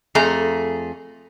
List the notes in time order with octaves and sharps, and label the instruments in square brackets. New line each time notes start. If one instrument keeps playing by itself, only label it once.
[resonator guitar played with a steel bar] F2 A3 G#4 A#5